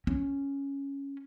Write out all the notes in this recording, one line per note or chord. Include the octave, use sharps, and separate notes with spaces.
C#4